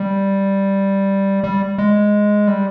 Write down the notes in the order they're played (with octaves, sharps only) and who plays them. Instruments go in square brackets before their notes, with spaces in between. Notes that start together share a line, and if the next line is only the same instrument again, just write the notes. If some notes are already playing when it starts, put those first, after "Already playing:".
Already playing: [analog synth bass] G3
G3
G#3
G3